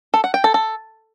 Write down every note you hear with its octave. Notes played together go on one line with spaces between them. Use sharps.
A4
F#5
G5
A4
A4